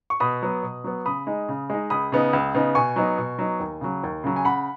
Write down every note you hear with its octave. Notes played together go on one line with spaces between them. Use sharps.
C#6
B2 B5 D#6
F#3 B3
B2
F#3 B3
C#3 B5 D#6
G#3 D#4
C#3
G#3 D#4
C#2 B5 D#6
C#3 B3 D#4
C#2
C#3 B3 D#4
B2 G#5 C#6
F#3 B3 D#4
B2
F#3 B3 D#4
D#2
C#3 F#3
D#2
C#3 F#3
G#5
C#3 F#5 B5